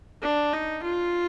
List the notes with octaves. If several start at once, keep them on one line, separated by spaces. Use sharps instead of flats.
D4
D#4
F4